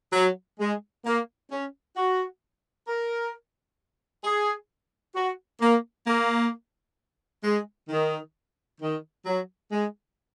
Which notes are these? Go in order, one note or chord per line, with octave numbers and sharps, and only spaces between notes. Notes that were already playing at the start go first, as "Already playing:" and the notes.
F#3
G#3
A#3
C#4
F#4
A#4
G#4
F#4
A#3
A#3
G#3
D#3
D#3
F#3
G#3